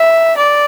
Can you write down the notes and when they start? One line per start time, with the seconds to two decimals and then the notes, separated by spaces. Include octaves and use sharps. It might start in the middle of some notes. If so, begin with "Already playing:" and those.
Already playing: E5
0.37 D5